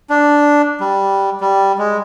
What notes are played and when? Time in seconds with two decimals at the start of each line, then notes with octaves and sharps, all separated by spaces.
0.10 D4
0.80 G3
1.41 G3
1.78 G#3